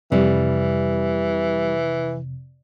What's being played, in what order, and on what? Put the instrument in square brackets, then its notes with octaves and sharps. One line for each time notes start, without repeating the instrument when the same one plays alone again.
[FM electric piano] F2 C3 [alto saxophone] E3 [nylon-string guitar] G3